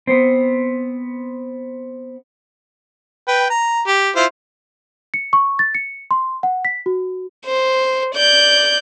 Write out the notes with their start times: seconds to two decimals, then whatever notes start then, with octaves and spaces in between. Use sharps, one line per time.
0.07 B3 C4
3.27 B4 G5
3.50 A#5
3.87 G4
4.16 E4 F4 C5
5.14 C#7
5.33 C#6
5.59 A6
5.75 C#7
6.11 C6
6.43 F#5
6.65 B6
6.86 F#4
7.45 C5
8.15 D5 G6